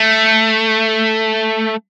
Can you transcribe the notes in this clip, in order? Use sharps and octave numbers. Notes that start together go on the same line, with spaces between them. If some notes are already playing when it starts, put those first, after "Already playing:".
Already playing: A3